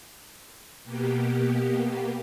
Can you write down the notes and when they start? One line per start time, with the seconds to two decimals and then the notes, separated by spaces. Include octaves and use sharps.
0.84 B2 A#3 B3 G4